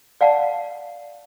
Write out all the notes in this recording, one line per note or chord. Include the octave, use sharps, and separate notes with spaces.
D5 F5 F#5 A5